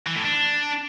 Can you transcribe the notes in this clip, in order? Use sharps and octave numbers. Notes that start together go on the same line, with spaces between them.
E3
A2
D4